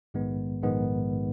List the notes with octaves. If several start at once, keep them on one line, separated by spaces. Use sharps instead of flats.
A#1 G#2 D#3 G#3 B3
A#1 G#2 D#3 G#3 B3